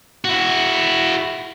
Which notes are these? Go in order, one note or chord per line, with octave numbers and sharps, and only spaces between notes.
E4 F#4